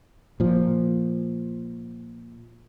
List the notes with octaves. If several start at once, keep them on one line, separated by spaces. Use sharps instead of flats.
A#2 F3